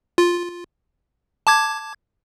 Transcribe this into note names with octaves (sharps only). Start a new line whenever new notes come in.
F4
A5 D6 G#6